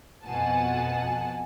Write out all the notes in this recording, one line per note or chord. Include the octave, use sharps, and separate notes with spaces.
F2 B2 F#5 G#5 A5